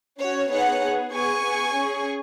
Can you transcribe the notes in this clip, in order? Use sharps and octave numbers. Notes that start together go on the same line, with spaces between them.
C#4 F#4 C#5
B3 D#4 G#4 C#5 F#5
B3 G#4
B3 G#4 G#5 C#6
B3 G#4
C#4 G#4